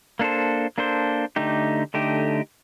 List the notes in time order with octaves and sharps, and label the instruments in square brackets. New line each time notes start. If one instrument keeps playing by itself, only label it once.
[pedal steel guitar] A#3 D4 A4 C5
A#3 D4 A4 C5
D3 A3 D#4 G4
D3 A3 D#4 G4